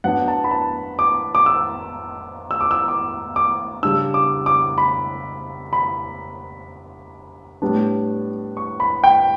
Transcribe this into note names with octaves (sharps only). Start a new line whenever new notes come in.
F#3 B3 D4 F#5
A5
B5
A5
D6
D6
E6
E6
D6
E6
D6
D6
C#3 G3 D4 E6
D6
D6
B5
B5
A2 G3 B3 D4
C#6
B5
G5